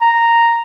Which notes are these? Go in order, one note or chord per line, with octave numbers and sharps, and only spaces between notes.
A#5